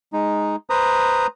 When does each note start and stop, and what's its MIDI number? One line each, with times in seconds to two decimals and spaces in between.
0.13 0.56 56
0.13 0.56 63
0.70 1.27 71
0.70 1.27 72
0.70 1.27 82
0.70 1.27 87